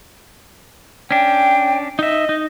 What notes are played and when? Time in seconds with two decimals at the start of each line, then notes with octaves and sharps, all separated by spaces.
1.11 C#4 D4 G5
1.99 D#4 D#5 E5
2.29 D#4